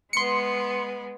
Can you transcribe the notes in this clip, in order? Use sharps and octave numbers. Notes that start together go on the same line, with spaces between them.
G#3 B3 C6 C#7